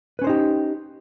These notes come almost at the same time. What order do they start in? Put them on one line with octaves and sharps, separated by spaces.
B4 C#4 C5 D#4 G4